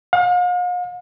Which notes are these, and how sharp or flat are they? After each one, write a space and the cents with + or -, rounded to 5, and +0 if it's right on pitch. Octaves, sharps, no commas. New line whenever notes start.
F5 +45